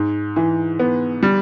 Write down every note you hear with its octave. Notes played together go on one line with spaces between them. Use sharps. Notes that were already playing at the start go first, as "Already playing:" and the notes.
Already playing: G#2
E3
B3
G3